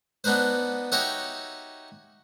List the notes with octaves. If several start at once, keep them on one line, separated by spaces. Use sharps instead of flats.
B3 D4 D#4 B4 C5
D#4 F#4 G4 C#5 D#5 E5